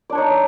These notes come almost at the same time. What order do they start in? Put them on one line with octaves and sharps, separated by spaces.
D5 D4 C#5 D#4